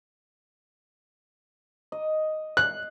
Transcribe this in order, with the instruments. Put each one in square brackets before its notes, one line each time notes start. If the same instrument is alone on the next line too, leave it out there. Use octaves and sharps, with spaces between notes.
[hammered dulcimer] D#5
[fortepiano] F#6